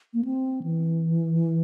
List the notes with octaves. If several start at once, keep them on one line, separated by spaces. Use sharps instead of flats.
A#3
C4
E3